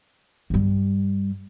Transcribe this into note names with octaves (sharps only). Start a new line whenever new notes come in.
G2 G3